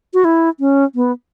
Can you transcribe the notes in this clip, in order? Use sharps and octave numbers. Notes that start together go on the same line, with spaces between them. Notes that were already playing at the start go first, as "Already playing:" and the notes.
F#4
E4
C#4
B3